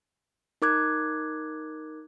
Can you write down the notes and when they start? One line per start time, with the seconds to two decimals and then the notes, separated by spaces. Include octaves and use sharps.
0.62 D#4 A#4 D6 F#6 G#6